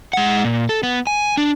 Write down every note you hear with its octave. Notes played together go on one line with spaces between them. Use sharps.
G#3 F#5
A#2
A4
B3
G#5
D4